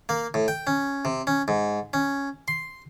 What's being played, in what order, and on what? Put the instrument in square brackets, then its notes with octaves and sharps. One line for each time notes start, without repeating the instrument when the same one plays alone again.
[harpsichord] A#3
A2
G5
C#4
C3
C#4
G#2
C#4
C6